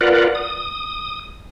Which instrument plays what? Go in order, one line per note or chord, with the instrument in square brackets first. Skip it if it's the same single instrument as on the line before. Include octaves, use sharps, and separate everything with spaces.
[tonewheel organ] F4 A#4 B4 D5 F#5
D#6